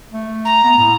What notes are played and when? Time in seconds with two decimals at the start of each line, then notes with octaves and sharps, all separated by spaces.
0.12 A3
0.45 A#5
0.64 B3
0.78 A2